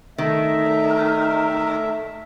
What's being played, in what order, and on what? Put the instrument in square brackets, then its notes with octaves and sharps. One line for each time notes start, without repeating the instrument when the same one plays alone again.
[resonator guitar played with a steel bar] D#3 [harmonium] A3 E5